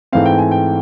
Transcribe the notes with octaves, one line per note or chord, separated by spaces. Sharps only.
G#2 E3 A3 C4 F5
G5
G#5
G5